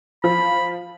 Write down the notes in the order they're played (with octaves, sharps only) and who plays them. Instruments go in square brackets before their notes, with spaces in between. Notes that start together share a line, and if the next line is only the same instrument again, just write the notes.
[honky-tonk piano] F3 F4 [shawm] B5